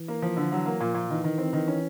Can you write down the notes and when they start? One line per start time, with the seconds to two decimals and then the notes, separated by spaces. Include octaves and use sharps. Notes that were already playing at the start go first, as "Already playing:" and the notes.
Already playing: E3
0.08 A#3
0.22 F3
0.37 D3
0.51 E3 F#3
0.66 A#3
0.80 A#2 F3
0.94 A#2
1.09 D#3 E3
1.24 D#3
1.38 C4
1.53 D#3
1.68 C#4